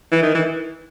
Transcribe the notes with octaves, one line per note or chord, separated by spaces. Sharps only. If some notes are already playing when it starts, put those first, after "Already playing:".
E3
D#3
E3